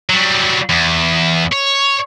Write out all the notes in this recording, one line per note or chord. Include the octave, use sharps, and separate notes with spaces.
F#3 G3
E2
C#5